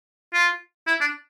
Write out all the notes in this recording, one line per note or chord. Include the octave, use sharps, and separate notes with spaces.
F4
E4
D4